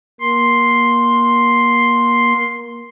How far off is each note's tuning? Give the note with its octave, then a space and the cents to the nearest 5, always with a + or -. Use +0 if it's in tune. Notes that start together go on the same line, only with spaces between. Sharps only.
A#3 +20 C6 +0